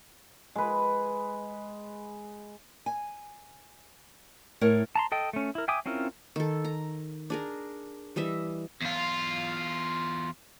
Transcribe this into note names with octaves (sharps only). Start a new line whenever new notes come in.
G#3 B4
G#5
A2 A#4 C#5
A5 A#5 C6
A4 D#5 G5
A3 C#4
E4 A#4
E5 G5 G#5 D6 D#6
C4 C#4 E4 F4 A#4
D#3 A4
A#5
D4 G#4 A#4
E3 G3 D#5 E5
E2 F4